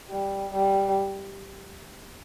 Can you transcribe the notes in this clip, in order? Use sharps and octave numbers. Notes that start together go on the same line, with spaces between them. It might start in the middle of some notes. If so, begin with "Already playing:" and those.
G3
G3